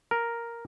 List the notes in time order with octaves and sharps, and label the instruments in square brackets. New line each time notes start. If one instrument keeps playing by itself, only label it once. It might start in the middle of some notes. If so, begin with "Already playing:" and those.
[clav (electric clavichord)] A#4